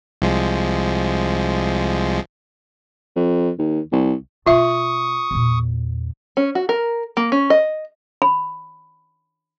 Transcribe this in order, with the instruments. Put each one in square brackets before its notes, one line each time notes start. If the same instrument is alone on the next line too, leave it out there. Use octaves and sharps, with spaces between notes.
[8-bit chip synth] C2 F3 G#3
[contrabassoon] F2
D#2
C2
[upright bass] B2 A#3 [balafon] F4 E5 [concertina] C#6 D#6
[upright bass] E2 A#2
[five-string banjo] C#4
F#4
A#4
A#3
C#4
D#5
[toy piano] B5